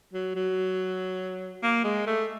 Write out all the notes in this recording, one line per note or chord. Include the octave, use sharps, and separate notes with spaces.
F#3
F#3
A#3
G#3
A3